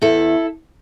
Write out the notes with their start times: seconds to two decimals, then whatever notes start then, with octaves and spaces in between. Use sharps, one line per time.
0.02 E2 E4 A4